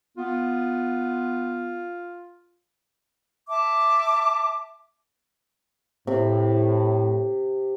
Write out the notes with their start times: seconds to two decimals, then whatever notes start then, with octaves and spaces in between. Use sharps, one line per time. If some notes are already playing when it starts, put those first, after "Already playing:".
0.17 B3 F4
3.48 E5 A5 D6
6.07 A2 C3